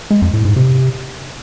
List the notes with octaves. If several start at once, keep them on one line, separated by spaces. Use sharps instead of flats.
G#3
F2
A2
G#2
C3